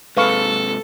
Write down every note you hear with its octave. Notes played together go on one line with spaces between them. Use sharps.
G#2 C3 A4 B4 F5 C#6